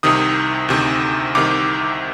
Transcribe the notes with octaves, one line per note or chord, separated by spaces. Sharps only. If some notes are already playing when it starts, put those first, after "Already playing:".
C2 C3 D#3 D#6
D2 C3 D#3
C2 C3 D#3 D6